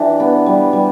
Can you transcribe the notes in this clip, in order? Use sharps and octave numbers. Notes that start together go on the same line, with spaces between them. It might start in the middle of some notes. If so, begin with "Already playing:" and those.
Already playing: E3 D4 G4
B3
G3
G3